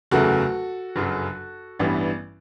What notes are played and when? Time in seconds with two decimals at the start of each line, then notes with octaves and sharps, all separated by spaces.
0.11 F#1 E2 C#3 F#3 A3 F#4 A4
0.96 G1 F#2 C#3 F#3
1.79 A1 G2 E3 G3 B3